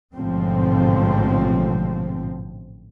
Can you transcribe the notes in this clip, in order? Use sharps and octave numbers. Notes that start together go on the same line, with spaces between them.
A1 G#2 B2 D3 F3 C4